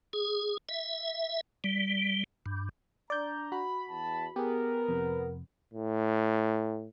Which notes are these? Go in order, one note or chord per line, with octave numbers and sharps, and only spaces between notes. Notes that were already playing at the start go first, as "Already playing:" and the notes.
G#4
E5
G3
G2
D4 D5 A#5 G6
F#4 B5
E2 A5
B3 G4 G#4 A#4
F2 C3
A2